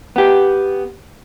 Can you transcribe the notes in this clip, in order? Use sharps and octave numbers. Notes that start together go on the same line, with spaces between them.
B3 G4